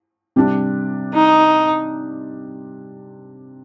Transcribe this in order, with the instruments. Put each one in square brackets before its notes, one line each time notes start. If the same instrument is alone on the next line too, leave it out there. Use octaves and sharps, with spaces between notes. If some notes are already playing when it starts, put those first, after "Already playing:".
[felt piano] C3 G3 D4
[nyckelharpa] D#4